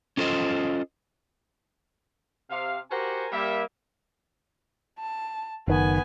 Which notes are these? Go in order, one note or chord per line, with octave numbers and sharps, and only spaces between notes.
C#4 F4 A4 C5 D#5
C3 F5
F#4 G4 A#4 C5 F#5 G#5
G3 A#3 E5
A5
F#1 D#3 B3 G#5